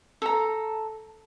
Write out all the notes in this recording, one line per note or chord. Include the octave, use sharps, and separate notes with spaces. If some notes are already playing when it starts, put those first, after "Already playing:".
A4 A#5